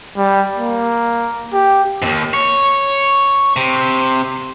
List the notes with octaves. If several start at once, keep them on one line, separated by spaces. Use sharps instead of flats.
G3
A#3
G4
D#2 G#2
C#5
C3